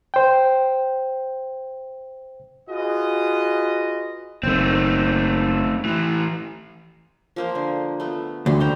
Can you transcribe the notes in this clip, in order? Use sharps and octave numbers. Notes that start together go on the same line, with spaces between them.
C5 G5
F4 F#4 G#4 B4 D#5
F#1 D#3 A3 C4
A2 E3
F3 A#3 C5
D3
A3 B3
D2 D3 G3
C5 G5 A#5